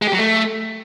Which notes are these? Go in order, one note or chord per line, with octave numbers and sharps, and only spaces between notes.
G#3
G4
F#3
A3